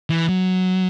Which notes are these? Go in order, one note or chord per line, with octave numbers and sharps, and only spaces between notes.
E3
F#3